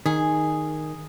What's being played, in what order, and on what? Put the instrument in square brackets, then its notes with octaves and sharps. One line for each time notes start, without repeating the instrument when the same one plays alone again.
[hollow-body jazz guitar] D#3 [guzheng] G#4